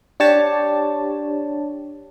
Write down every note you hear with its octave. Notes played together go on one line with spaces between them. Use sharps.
D4 G4 C#5 A5